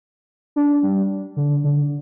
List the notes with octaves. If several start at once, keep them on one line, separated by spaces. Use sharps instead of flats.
D4
G3
D3
D3